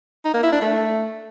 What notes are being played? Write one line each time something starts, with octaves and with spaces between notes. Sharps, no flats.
D#4
A#3
E4
D4
A3